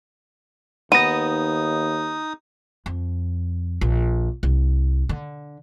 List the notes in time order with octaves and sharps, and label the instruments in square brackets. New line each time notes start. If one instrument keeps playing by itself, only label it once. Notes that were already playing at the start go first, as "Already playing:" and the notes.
[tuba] D#2 [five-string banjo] B3 [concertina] D#4 D#6 [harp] A#6 D#7
[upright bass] F2
A#1
C2
D3